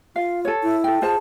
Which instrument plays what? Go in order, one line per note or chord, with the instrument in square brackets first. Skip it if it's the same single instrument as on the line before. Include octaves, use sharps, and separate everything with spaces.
[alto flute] F4 [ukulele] F5
[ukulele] A4 C#5
[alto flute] E4
[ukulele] A4 G5
[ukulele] F4 C5 A5 [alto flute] G#4